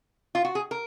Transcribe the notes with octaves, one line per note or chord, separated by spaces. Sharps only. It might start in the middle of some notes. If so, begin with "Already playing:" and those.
F4
F#4
G#4
A#4